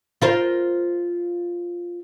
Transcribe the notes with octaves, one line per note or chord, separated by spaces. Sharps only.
F4 A#4 C5